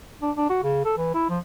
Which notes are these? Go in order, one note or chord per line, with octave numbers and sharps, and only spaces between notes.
D4
D4
F#4
C#3
A4
E3
E4
F3